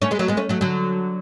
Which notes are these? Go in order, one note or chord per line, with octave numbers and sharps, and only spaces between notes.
A3 C#4
G#3 B3
F#3 A3
G#3 B3
A3 C#4
F#3 A3
D3 F#3